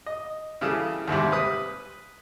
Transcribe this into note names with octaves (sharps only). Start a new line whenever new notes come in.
D#5
C#3 E3 G3 G#4 A4
D#2 G#2 C3 G3
B4 D#6